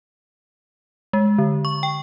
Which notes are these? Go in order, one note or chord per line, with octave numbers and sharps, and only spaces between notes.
G#3
D3
C#6
G5